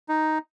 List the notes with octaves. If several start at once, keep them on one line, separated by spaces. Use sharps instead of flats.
D#4